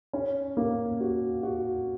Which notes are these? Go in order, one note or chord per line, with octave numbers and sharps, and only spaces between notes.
C#4
A#3
F#4
F#4